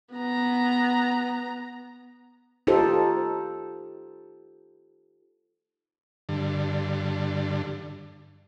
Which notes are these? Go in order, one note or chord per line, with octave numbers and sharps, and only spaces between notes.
B3 A#5
D#4 F4 G4 A4 C5
G2 D3